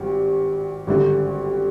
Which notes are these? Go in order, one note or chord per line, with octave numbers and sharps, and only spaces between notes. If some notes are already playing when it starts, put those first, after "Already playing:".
Already playing: G#1 G2
G#1 G2 D3